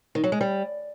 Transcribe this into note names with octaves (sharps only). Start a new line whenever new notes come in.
D#3
F#3
G#3
G3